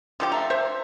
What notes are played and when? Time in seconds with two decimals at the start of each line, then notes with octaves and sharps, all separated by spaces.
0.20 D3 F3 G4
0.32 A3 A#5
0.50 C5 E5